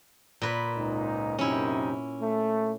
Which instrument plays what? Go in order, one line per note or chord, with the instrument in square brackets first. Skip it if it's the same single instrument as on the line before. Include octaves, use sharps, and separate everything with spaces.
[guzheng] A#2 B4
[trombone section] C#2 G#2 D#4
[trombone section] F#2 C3 D#4 [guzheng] C#4 E4
[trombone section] A3